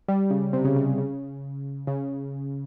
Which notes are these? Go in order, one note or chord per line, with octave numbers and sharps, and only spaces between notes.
G3
C#3
C3
C#3
C#3
C#3
C#3